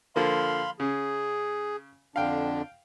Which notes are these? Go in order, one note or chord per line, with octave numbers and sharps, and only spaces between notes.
D3 F3 A#3 F5 B5 C6
C#3 G#4
F2 D3 D4 F5 G5